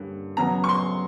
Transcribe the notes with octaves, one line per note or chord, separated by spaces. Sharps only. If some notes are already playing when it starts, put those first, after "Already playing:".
Already playing: G2 D3 G3 A#3 C#4
C#3 F#3 B3 A#5
C#6
C6